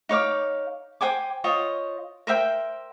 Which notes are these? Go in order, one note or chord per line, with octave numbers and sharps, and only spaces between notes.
D#4 C#5 F5 D6
C5 G5 G#5 D6
F4 C5 C#5 D#5
A#4 C5 E5 G5